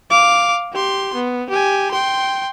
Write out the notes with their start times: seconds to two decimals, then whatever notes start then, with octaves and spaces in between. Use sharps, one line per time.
0.10 F5 D6
0.72 G4 C6
1.15 B3
1.50 G4 G#5
1.91 G5 C6